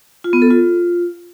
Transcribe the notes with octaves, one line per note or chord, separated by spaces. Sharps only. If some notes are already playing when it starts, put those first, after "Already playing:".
F4
B3
A4
F4